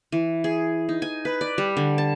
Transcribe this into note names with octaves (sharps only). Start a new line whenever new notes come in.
E3
G#4
D#4
G#5
B4
D5
G3
D3
A5